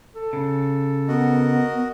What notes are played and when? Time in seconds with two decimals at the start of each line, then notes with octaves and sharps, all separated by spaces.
0.15 A4
0.33 C#3
1.08 B3 F#4 A#4 D#5